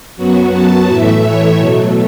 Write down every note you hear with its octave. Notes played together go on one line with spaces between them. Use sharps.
F#2 F#3 B3 F#4
A5
A2 E3 A3 E5
C#5
B2 F#3 A3